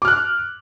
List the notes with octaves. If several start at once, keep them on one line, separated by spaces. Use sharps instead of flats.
D6 F6 F#6